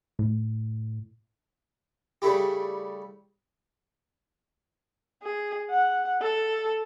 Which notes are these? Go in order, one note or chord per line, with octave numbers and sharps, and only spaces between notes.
A2
C#3 G3 A3 E4 G4
G#4
F#5
A4